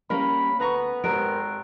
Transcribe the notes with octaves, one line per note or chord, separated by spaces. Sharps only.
G3 A#3 C#4 A#4 B5
D2 B3 B4 A#5 C#6
G#1 G4 A#4 C5 A#5 F#6 D7